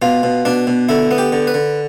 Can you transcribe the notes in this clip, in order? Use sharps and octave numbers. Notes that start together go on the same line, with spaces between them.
B2 F4
B2
B2 D4
B2
D3 E4
B3
G4
D3
B4
D3